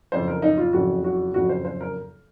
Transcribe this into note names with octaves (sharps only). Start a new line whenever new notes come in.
F#1 F2 C#3 C5
A#4
D#4
F4
F#1 F2 C#3 F#4
F#4
F#1 F2 C#3 F#4
C5
C5
A#4